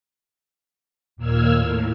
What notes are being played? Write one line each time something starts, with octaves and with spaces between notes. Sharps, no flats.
D#2 A#2 A#3 E6 F6 G#6
A2